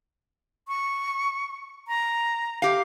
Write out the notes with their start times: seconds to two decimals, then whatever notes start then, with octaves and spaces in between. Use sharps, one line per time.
0.68 C#6
1.88 A#5
2.62 G4 F5